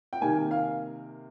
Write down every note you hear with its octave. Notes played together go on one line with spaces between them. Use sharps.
G5
C3 D#3 A#3 G#5
F5